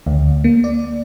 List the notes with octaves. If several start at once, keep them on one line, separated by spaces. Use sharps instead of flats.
D2
A#3
D5